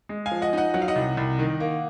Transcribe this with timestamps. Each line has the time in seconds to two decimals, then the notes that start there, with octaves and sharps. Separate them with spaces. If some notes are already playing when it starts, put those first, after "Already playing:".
0.09 G#3
0.26 F5 G#5
0.31 F3
0.42 D#5 F#5
0.53 D#4 D#5 F#5
0.74 F#3 F#5
0.82 F5
0.88 D#5 F#5
0.96 C2
1.17 C2
1.39 D#3
1.60 A#3